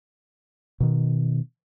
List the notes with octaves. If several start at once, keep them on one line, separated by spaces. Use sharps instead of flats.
B2 D#3